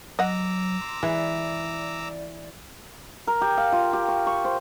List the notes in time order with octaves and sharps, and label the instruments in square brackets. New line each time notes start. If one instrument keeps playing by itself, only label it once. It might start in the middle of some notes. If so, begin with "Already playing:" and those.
[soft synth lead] F#3 [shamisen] D#5 F#5 [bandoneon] A#5 D6 E6
[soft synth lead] C6
[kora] E3 [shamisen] G#3 E4 [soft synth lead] D5
[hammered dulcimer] A#4
G4
F5
F4
G4
C#6
C#6
C5